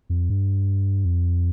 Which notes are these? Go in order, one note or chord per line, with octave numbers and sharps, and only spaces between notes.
F2
G2
F2